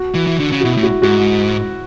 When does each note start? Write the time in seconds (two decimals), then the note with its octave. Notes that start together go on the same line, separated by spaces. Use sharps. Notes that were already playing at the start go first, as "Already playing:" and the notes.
Already playing: F#4
0.14 E3
0.27 E3
0.40 D3
0.52 C#3
0.60 F#4
0.64 B2 E4
0.77 A2
0.83 F#4
1.02 G#2 F#4